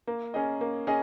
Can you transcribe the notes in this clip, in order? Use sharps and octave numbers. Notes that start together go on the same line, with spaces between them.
A#3
C#4 G#4 D#5
A#3
C#4 G#4 D#5